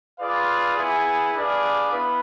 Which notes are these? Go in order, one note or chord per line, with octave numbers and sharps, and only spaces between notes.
F4 G#4 B4 D5 F5
B3 E4 G#4
D4 G#4 B4 D5 F5
B3 E4 B4 F5